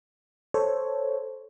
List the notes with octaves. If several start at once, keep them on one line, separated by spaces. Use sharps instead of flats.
A4 C5 C#5